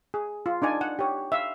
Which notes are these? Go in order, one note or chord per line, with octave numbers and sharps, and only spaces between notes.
G#4
F4
D4 D#4 D5 G#5
F#5
G4 C#5
E5 F5